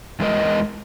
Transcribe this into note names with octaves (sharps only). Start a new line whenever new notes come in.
E2 G#3 A#4 D#5